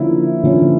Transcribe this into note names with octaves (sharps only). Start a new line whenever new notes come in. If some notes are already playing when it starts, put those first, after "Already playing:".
Already playing: D3 F3 A#3 C#4 E4
D3 F3 A#3 C#4